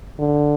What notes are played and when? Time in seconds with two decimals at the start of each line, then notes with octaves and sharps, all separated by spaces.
0.19 D3